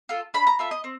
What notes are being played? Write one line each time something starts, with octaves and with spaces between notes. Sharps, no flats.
F4 A4
D4 B5
A#5
F4 A4 E5
D#5
C4